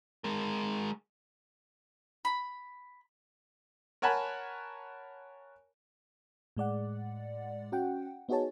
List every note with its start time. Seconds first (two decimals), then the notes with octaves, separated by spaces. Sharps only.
0.24 G#3 A#4
2.25 B5
4.02 A#4 C#5 F#5 G#5 A5 B5
6.57 A2 G#3 D5 F#5
7.72 C#4 F#4 F#5 G5
8.29 B3 D#4 F#4 G#4 C#5 A5